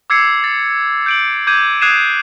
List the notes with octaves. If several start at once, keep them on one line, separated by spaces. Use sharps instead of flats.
D6 E6 G#6 C7 C#7
A6
G6 D7 F#7
D6 G6 G#6 D#7
D#6 F#6 G#6 C7 D#7 E7